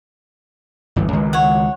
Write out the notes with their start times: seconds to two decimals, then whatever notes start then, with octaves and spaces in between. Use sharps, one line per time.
0.96 G1 E2
1.13 C#2 D#3 G#3
1.33 C#5 F#5